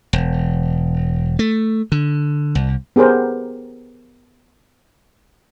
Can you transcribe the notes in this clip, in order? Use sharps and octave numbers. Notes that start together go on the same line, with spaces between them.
E1
A3
D3
C2
B3 G4 G#4 A#4 C5